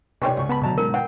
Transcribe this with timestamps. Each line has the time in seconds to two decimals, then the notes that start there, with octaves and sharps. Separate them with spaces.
0.22 C3 D#3 C4 C#4 B4 C#5 D5
0.37 C#2 C#6
0.49 B3 A5 B5
0.62 D2 B2 F#3 A5 A#5
0.78 G#2 A#4
0.94 E3 F#5 G5